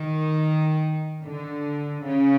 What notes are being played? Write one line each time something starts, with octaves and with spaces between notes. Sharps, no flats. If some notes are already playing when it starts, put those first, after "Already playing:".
Already playing: D#3
D3
C#3